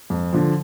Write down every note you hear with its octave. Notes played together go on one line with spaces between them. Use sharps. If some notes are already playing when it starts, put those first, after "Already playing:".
F2
D3 F3